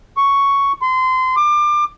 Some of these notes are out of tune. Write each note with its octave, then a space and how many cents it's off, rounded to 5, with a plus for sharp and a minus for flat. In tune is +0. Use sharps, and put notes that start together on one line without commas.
C#6 +5
C6 -25
D6 +30